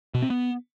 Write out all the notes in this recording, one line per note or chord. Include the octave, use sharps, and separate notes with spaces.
B2
C4
B3